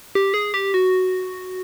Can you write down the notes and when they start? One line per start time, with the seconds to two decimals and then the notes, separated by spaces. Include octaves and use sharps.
0.15 G4
0.34 G#4
0.54 G4
0.74 F#4